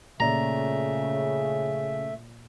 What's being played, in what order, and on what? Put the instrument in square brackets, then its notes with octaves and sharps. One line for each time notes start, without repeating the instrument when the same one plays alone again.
[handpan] A#2 A#3 D5 [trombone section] C#3 [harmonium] A3 E5 [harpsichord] A#5